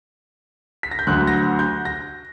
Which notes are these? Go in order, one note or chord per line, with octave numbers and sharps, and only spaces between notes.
B6
A#6
G6
D2 D3 F#3 F#6
A#6
G6
G6
A#6